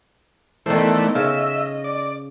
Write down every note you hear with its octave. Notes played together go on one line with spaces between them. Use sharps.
D#3 E3 A3 B3 A4 C5 D5
C#3 D#5 E5
D5